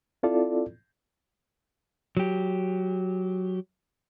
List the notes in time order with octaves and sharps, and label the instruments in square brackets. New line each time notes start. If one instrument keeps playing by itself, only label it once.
[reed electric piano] C4 E4 F4 A4 D5
[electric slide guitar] F#3 G4